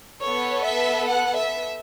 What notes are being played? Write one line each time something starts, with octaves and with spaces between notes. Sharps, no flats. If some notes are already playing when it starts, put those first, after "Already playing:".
B3 A4 C#5
E5
F#5
E5